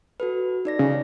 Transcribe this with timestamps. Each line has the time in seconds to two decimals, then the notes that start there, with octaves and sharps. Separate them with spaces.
0.20 F#4 A4 B4
0.65 D#4 D5 A#6
0.79 C#3